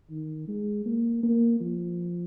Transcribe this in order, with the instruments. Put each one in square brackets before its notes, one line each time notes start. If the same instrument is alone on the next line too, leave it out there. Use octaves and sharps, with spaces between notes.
[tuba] D#3
G#3
A#3
A#3
F3